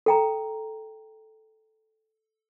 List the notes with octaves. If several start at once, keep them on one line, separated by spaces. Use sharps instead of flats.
A4 G5 A#5